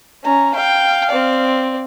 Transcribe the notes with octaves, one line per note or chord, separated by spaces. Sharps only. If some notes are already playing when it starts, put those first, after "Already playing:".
C#4 A#5
F5 G5
C4 D5